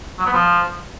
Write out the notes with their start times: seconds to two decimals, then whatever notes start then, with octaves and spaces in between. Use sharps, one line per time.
0.19 F#3
0.26 B3
0.33 F3